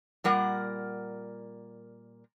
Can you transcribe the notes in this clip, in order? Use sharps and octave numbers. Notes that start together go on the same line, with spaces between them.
A#2 G3 A#4 F#5